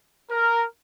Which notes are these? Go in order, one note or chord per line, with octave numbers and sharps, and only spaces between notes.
A#4